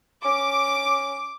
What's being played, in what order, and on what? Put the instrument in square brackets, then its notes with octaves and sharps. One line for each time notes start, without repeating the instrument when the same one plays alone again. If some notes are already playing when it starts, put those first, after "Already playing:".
[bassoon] C#4 [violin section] D6